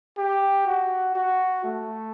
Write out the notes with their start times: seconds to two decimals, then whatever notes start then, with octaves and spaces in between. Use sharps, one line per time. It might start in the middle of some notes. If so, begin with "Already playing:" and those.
0.18 G4
0.66 F#4
1.15 F#4
1.64 A3